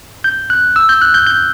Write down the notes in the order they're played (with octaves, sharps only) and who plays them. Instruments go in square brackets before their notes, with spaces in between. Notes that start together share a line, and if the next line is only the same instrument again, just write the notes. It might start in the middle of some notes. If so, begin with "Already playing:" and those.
[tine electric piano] G6
F#6
E6
G6
F#6
G6
G6